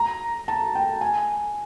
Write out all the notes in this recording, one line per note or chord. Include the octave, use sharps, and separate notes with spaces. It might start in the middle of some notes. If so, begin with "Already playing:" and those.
Already playing: A#5
A5
G5
G#5